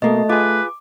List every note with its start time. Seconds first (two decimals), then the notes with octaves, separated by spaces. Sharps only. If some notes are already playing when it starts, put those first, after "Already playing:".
0.02 B2 A3 A#3 D#5
0.30 F4 G#4 B4 D6